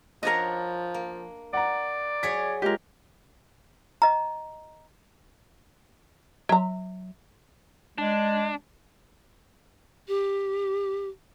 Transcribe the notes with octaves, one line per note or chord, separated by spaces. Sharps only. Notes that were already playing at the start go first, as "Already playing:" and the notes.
F3 D4 A#4 C#5 D#5 F#5
A#3
D5 F#5 A#5
F#3 G#4 C#5 B6
G#3 F4 G4 A#4
D#5 A#5
F#3 E5 A#5
G#3 D4
G4